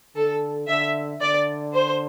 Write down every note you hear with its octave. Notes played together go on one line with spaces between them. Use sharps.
D3 A4
D3 E5
D3 D5
C5